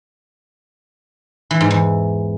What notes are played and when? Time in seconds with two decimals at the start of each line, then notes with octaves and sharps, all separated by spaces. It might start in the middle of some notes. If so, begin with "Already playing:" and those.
1.51 E3
1.61 G#2
1.70 E2